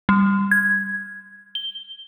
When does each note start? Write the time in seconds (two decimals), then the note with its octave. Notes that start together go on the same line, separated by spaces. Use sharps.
0.09 G3
0.51 G#6
1.55 G7